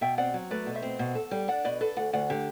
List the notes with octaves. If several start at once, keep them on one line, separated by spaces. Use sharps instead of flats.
B2 E5 G5
C4 D5 F#5
F#3
A3 B4 D5
B2
C5 E5
C4
B2
A4
G3
D4 D5 F#5
B2 B4 D5
A4 B4 D5
D2 D5 F#5
D2 D5 F#5
D3 G4